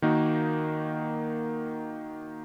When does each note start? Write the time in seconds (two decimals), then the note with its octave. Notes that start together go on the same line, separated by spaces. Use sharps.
0.02 D#3 A#3 D#4 F#4